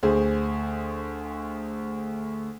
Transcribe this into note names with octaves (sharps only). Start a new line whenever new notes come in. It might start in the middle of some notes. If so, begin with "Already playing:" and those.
D2 G#4 C5